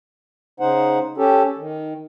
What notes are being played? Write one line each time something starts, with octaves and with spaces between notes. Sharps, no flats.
C#3 D#4 C5 F#5
C#4 G4 A4
D#3